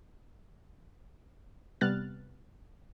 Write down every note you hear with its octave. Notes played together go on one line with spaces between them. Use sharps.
C3 G3 B3 F6 F#6 A6